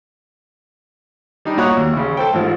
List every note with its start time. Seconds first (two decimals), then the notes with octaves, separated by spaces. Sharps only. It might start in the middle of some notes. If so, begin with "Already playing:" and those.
1.45 G3 D4 D#4
1.57 A#2 F#4 C#5 A#5 D#6 F#6
1.77 D#2
1.93 A1 C#3
2.17 A4 C5 G5
2.33 A1 G#2 F3